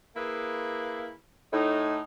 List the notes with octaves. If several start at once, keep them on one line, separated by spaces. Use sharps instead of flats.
A#3 E4 G#4 B4 F5
A2 D#4